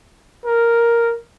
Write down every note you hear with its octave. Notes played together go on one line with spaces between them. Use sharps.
A#4